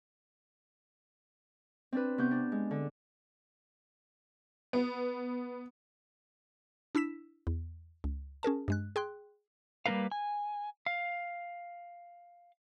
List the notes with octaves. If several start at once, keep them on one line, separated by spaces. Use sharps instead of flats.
C4 D4 B4
C3 B3 C#6 G6
D4
G#3
D3
B3
D4 E4 E6 B6 E7
E2
C#2
C#4 G#4 A#4 A5
G2 G#3 F#6
G#4 G5 C6 F#6
G3 A#3 B3 A#4 B4 F5
G#5
F5